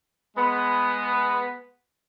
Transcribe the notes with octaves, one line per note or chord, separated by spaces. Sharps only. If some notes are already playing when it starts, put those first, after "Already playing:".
G#3 B3